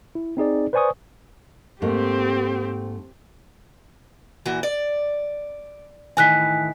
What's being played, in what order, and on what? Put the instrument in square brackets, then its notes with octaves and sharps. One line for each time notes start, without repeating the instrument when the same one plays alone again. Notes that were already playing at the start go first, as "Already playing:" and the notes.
[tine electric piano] E4
C4 D#4 G#4 D5
B4 C5 D5 G#5 C#6 D#6
[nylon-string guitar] G#2 A3 A#3 [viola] C4 G4
[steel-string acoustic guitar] A#2 E3 F#4
D5
[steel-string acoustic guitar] A2 D#3 E3 [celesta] G#5 F#6 B6